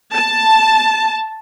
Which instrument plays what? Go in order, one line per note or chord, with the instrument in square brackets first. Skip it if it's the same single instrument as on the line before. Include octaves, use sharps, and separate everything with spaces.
[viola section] A5